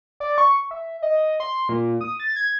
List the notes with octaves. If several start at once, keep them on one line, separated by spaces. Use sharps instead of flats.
D5
C#6
E5
D#5
C6
A#2
D#6
A6
G#6